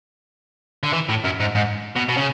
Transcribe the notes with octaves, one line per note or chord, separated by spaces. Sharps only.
D3
E3
A2
F#2
G#2
G#2
B2
B2
C#3